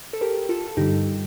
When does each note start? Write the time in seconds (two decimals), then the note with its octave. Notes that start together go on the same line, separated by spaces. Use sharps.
0.13 A4
0.21 G4 A#4
0.49 F4 A4
0.68 A4
0.77 G2 D3 G3 D#4 G4